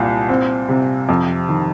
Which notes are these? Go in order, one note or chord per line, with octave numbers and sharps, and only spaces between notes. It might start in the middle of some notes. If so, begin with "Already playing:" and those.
Already playing: C2 A#2
C4
C3
F2
D#3